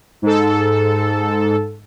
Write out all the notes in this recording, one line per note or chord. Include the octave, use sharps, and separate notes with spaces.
G#2 A4